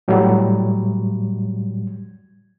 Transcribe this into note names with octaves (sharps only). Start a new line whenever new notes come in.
A2 F#3 G3